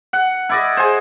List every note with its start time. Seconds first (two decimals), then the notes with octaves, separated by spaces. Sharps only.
0.13 F#5
0.49 E4 D5 D#5
0.77 G#4 C5